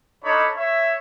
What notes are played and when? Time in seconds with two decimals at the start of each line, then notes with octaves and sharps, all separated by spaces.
0.23 D4 D#4 A4 C#5 B5
0.55 C#5 E5